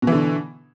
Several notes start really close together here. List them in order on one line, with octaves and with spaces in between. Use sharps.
B2 E3 D3